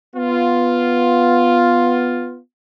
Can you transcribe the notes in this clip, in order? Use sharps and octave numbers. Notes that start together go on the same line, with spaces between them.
B3 F4